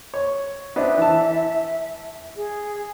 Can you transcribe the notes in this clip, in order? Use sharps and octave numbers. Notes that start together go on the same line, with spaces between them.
C#5
B3 C4 D4 E5
E3 A5
G#4